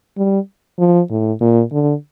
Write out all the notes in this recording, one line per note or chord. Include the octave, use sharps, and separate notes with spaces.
G3
F3
A2
A#2
D3